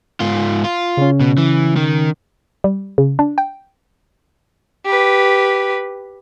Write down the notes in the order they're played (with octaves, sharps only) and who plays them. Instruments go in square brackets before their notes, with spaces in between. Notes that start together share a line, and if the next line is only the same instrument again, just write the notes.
[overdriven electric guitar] G#2 F4
F4
[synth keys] C#3 C#4
[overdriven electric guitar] B2
E3
D#3
[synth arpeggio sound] G3
C#3
D4
G5
[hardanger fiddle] G4 B4